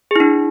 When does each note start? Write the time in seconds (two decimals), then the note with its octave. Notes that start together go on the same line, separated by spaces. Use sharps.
0.11 G#4
0.16 E4
0.20 D4